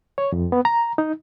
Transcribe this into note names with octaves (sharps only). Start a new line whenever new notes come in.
C#5
F2
B3
A#5
D#4